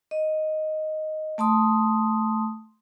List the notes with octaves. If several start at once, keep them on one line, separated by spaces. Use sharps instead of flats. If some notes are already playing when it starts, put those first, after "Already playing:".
D#5
A3 A5 C6 D#6